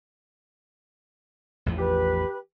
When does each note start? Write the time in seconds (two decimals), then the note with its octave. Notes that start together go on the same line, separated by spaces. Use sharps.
1.66 A1 E2 F3
1.78 G4 B4